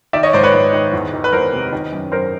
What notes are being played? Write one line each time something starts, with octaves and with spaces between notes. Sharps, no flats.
D#3 D5 E5
C#5 D#5
G#2 C5 D5
B4 C#5
G#2
D#3
E2
D#3
B4
E2 A#4 C5
C3
D#3
F#2
F#2 A#4 C5